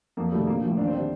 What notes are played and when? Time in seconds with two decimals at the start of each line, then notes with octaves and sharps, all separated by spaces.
0.17 F2 A#3
0.32 C3 D#3 G3 A3
0.47 A#1 A#3
0.63 A2 F3
0.78 D#2 D4
0.87 C4
0.93 D3 G3 D4